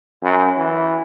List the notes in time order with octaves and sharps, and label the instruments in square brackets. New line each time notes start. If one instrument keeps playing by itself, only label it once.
[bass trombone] F#2
E3